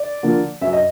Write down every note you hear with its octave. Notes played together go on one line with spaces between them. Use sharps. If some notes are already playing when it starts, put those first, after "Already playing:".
Already playing: D5
D3 F3 A#3
F#2 E5
D#5